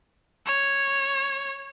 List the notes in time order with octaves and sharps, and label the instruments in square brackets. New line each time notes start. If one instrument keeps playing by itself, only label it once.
[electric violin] C#5